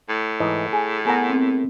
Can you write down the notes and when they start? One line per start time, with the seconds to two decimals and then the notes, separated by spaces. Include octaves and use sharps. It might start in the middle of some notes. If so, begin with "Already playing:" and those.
0.09 A2
0.40 G#2 E3 D#5
0.73 G#4
1.05 B3 G#4 A#4 F#5 A#6
1.30 C4